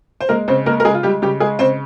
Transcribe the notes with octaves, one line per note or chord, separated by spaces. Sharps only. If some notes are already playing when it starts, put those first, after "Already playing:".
C5
G#3 A#3 A#4
C#3 C4 C5
G#3 A#3 A#4
A#4
C#3 G#3 G#4
F4
G3 G#3 G4
C#3 G3 G4
G#3 G#4
C#3 C4 C5